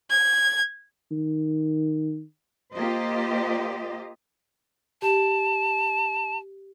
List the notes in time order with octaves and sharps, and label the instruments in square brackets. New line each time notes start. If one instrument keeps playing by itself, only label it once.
[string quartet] G#6
[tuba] D#3
[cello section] A#3 F4 G4 C5 D#5
[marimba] G4 [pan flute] A5